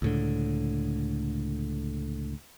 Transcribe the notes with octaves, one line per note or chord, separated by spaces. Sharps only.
C#2 A2 D3